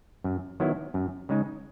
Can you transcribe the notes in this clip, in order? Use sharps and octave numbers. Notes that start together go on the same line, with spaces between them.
F#2
D#3 F#3 B3 E4
F#2
C#3 G#3 D#4